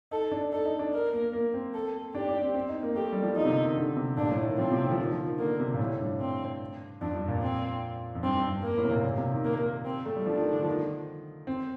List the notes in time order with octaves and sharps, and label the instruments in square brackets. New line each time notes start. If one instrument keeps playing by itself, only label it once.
[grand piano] D#4 [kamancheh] A4
[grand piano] D4
[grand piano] D#4 [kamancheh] A4
[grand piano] D#4
D4
[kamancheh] A#4
[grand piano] A#3
A#3
C4
[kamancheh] A4
[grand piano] D4 [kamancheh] G4
[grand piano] D4
C4
C4
D#4
A#3
[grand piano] A3 [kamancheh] G4
[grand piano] G3
F3
[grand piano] F3 [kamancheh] D#4
[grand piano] C3
D3
D#3
D3
C3
[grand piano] A#2 [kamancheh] D4
[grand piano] A2
D#3
[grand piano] F3 [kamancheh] C4
[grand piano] C3
D3
F3
D#3
F3
D#3
[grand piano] D3 [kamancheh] A#3
[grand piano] C3
A#2
A2
G2
[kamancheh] C4
[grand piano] F2 [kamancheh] D4
[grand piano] G2
A#2
[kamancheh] C4
[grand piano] F2
[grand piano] G2 [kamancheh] C4
[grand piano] G2
G2
[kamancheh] A#3
[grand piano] A2
C3
A#2
A#2
C3
D#3
[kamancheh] A#3
C4
[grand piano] A3
G3
[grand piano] F3 [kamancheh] D4
[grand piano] D#3
D3
F3
D#3
C4